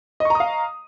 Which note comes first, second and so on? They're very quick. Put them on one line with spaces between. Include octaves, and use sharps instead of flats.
D#5 C#6 A#5 D#6 F5